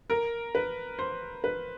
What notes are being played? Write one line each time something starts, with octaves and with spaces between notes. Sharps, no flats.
A#4
B4
C5
B4